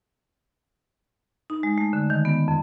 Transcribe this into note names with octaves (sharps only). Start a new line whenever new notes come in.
D#4
G#3
A3
D3
D#3
B3
F2